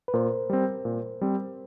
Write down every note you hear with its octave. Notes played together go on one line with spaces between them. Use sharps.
B4
A#2 A#4 C5
G3 C4
A#2
G3 C4